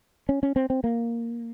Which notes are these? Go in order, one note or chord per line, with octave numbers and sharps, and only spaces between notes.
C#4
C#4
C4
C4
A#3